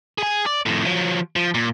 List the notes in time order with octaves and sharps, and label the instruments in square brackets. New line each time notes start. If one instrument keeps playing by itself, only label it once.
[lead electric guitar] G#4 G#5
D5
F2 A2
F3 F#3
F3
A#2